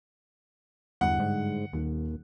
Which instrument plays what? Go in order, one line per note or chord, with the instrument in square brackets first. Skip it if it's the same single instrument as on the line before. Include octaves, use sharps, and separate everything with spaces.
[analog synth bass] E2 [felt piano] G2 D3 [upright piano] F#5
[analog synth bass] G#2
[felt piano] D#1 D#4 [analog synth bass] D#2